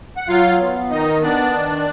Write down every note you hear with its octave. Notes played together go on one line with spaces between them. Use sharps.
F#5
F#3 F4 F5
B3
D#3 D#4 D#5
B3 D4 D5
D#3